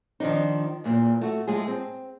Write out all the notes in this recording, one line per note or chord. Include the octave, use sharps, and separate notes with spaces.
D#3 F3 G3 D4 D#4
E2 A#2 E3
A3 F#4
A2 G#3 F4 G#4
C4